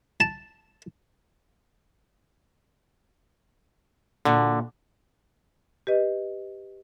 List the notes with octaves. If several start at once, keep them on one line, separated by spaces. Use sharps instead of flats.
A5
A#2 D3 D4 F#4
G4 B4 D#5